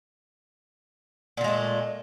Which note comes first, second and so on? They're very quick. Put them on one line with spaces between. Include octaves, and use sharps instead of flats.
A#2 D3 G#3 A3